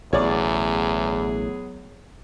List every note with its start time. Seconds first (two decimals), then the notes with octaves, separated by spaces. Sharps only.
0.13 A1 E2 B2 F#3 B3 G#4 C#5 D5